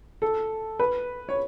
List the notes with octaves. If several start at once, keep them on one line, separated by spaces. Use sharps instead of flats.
A4
B4
C#5